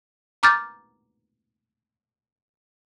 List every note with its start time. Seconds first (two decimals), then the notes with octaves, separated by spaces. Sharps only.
0.43 A#5 D6 F6 G6 A6